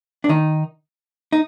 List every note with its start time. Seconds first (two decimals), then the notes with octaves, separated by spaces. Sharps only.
0.24 D4
0.29 D#3 D#4
1.32 D#4